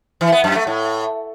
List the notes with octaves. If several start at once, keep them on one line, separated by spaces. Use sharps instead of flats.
E3
B3
F#2
A3
A2